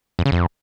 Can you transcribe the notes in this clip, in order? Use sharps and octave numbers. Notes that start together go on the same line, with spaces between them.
F2
C#3
F2